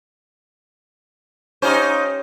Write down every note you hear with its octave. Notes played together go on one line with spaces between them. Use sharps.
C#4 D#4 F4 G4 C5